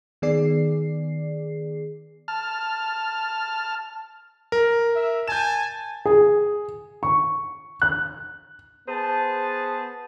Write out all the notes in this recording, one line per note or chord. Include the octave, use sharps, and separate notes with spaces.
D#3 B3 G#4 D5 C7
A5 F6
A#4
E5
G#5 A5 G6 E7
G#4
C#6
F#6
B3 G#4 C5 A5